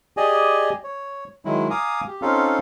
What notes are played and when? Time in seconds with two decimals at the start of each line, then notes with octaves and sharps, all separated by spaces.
0.17 G4 G#4 D5 D#5 G#5
0.84 C#5
1.45 D#3 F#3 G#3 E4
1.70 F5 G#5 A#5 D6 D#6
2.07 G4
2.22 C4 C#4 D#4 F4 A4 F5